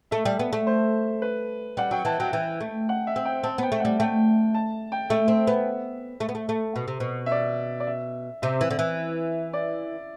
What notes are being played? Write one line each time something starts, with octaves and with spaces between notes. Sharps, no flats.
A3 E5
G3
B3
A3
C5
B4
G3 F#5
F#3 G5
E3 A5
F#3 G5
E3 G5
A3
F#5
E5
C4
G5
C4 A5
B3 G5
A3
G3 F#5
A3 G5
A5
G5
A3 E5
C4
B3
A3
B3
A3
A3
B2
C3
B2
E5
D5
D5
E5
C3 E5
E3
D3
E3
D5